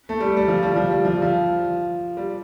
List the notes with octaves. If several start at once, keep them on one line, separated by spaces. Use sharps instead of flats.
A3
G3
G3
F3
G3
F3
G3
F3
F3
G3